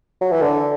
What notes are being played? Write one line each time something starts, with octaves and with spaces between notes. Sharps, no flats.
F#3
E3
D3